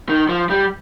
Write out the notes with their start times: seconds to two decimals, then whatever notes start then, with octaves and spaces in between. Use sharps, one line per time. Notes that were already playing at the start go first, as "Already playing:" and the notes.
0.09 D#3
0.29 F3
0.50 G3